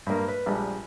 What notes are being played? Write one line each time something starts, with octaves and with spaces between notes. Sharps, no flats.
G2 A#3
B4
A#1 G3 G#3